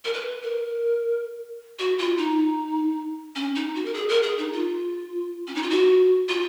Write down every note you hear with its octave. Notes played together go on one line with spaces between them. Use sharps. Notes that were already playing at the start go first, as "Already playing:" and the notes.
A#4
B4
A#4
F#4
F4
D#4
C#4
D#4
F#4
A#4
G#4
A#4
G#4
D#4
F4
C#4
D#4
F4
F#4
F4